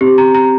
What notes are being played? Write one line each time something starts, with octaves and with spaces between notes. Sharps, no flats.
C4 G4
A#5
A#5